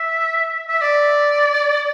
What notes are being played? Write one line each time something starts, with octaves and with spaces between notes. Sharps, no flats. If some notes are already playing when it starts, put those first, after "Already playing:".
Already playing: E5
E5
D5